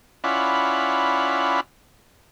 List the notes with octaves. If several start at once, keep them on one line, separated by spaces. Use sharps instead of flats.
C#4 E4 F4 D5 F#5 B5